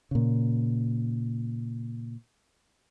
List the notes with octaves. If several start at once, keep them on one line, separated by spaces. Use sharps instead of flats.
A#2 C#3